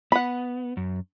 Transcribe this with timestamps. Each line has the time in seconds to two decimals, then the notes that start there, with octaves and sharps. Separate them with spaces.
0.12 B3 F#5 B5
0.77 F#2